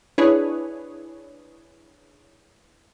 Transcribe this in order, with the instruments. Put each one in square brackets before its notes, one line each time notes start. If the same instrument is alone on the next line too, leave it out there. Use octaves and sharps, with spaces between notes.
[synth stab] D4 E4 G#4 B4 C#5